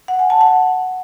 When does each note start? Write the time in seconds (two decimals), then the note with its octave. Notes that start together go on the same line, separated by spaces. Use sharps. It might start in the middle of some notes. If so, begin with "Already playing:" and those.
0.08 F#5
0.19 G#5
0.30 A5
0.41 F#5